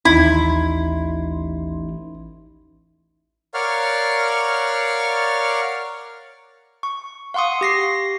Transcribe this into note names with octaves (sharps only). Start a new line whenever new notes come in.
A1 D#2 D#4 E4 C6
A#4 C#5 D5 F5 F#5 F6
C#6
F5 F#5 C6 C#6 D#6
G4 A#6 C7